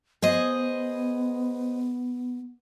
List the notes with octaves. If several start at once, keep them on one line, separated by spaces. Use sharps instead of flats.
B3 G#4 C5 D#5